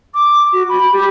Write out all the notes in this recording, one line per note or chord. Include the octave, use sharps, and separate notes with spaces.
D6
F#4
B5
G4